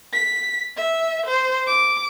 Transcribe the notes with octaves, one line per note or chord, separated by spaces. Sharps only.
B6
E5
C5
D6